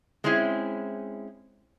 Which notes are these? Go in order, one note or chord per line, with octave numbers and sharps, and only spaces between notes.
G#3 C4 C#4 E4 G#4